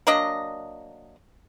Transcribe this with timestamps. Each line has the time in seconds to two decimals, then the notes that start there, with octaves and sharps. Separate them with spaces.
0.07 F#3 A#3 D4 D#5